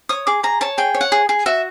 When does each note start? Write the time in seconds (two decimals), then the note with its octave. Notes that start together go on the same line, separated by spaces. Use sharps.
0.09 C#5 D#6
0.27 G#4 D6
0.43 G#4 A#5
0.61 C#5 A5
0.78 G#4 G5
0.94 C#5
1.01 F#5
1.12 G#4
1.29 G#4
1.46 F#4 E5